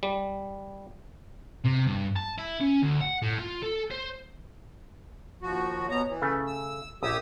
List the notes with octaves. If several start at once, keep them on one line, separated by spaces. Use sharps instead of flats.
G3
C3
G2
A5
E4
C#4
D2
F#5
A2
F4
A4
C5
D#2 F3 F#4
B2 B3 C#5 A#5
E3
C#3 A3
E6
A#1 G4 D#6 E6